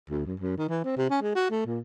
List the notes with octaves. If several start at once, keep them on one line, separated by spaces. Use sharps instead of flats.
D2
F#2
F#2
D#3
E3
C4
C3
C#4
G#3
F#4
A3
A#2